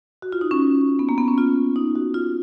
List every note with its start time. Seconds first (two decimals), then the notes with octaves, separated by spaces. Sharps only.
0.22 F#4
0.32 F4
0.41 D#4
0.51 C#4
0.99 B3
1.09 A#3
1.18 B3
1.28 C#4
1.38 F4
1.76 D#4
1.96 F#4
2.14 F4